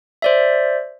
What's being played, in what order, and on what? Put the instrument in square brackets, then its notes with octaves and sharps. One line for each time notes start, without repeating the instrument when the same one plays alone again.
[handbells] C5 D5 E5